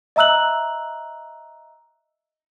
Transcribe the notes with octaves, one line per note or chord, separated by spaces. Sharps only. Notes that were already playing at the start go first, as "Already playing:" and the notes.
D#5 E5 A#5 E6 F#6 F#7